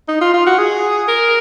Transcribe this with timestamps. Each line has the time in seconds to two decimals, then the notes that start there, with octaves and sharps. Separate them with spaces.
0.08 D#4
0.21 F4
0.34 F4
0.46 F#4
0.59 G#4
1.08 A#4